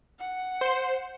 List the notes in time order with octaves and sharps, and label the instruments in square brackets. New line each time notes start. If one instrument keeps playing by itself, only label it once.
[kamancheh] F#5
[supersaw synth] C5